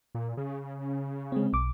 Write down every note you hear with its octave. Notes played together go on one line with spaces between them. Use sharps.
A#2
C#3
G#3 C4
B1 D6